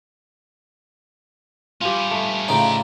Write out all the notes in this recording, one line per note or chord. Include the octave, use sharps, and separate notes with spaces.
G2 C#4 F4 G4
A3
A2 C#3 F3 D#4 D5 E5